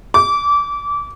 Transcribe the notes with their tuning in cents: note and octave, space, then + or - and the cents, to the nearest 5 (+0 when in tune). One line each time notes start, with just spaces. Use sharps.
D6 -25